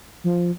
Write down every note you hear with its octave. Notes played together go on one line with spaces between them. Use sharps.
F3